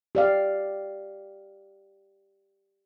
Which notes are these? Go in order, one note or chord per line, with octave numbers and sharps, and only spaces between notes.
G4 D5 F5